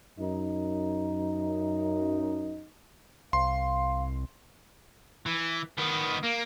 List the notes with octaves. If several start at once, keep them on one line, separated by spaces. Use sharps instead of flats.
F#2 D#4
C2 F5 C6
E3
D#3 B3
A#3